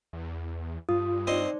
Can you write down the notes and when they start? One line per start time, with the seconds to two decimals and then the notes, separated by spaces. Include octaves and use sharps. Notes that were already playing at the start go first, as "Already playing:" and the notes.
0.13 E2
0.89 G2 F4 D#6
1.27 C4 D#4 C5 D5 D#5 C6